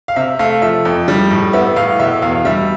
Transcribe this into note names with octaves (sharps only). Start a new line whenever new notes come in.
F5
C3 E5
A3 F5
F3 E5
F2
G3
A2
B3 E5
A2 F5
B2 E5
E2 F5
G3 E5